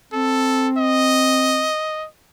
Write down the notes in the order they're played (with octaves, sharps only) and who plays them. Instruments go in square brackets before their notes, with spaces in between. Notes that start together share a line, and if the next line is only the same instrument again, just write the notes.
[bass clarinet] C4 [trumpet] A4
[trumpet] D#5